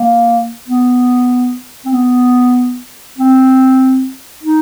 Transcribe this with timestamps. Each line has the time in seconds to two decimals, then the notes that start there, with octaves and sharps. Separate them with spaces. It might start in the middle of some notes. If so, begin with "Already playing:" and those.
Already playing: A#3
0.68 B3
1.86 C4
1.93 B3
3.18 C4
4.44 D#4